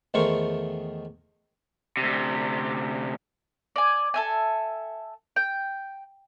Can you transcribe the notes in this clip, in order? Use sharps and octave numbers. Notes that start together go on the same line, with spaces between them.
E2 D#3 A3 A#4 C5 C#6
D2 C3
D5 G#5
A4 E5 G#5
G5